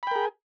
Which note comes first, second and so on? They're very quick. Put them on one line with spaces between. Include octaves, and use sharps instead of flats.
B5 G5 A#4 G#4